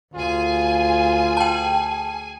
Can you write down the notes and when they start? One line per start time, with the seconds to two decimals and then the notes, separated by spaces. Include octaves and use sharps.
0.15 D2 F4 G#4 G#5
1.37 G5 A5